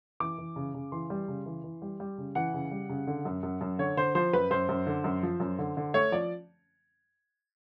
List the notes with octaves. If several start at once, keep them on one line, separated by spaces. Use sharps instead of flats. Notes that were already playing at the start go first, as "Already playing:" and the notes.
E3 D6
E3
C#3
C#3
E3 C6
G3
C#3
E3
E3
G3
G3
C#3
E3 F#5
C#3
G3
C#3
D3
F#2
F#2
F#2
D3 C#5
D3 C5
F3 C5
F#2 B4
F#2 C5
F#2
D3
F#2
F3
F#2
D3
D3
A3 C#5
F3 D5